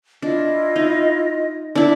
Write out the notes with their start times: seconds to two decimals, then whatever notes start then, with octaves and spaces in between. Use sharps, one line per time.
0.22 D4 E4 F4 D#5
0.76 D#4
1.75 D4 E4